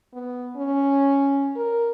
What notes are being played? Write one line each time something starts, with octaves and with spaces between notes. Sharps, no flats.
B3
C#4
A#4